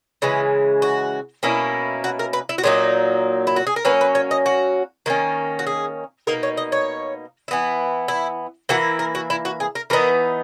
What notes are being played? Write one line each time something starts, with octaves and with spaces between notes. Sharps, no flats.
C#3 E3 G#3 E4
F#4
B2 A#3 C#4 E4
F#4
A#4
B4
E4
F#4
A#2 F#3 A#3 D#4 G#4
E4
F#4
G#4
A#4
F#3 A#3 C#4 B4
B4
C#5
D#5
F#4
D#3 A#3 C#4
F#4
G#4
B2 A#3 D#4 A#4
C#5
D#5
C#5
E3 B3 E4
E4
E3 A#3 E4 F#4
A#4
F#4
E4
F#4
G#4
A#4
E3 B3 D#4 A#4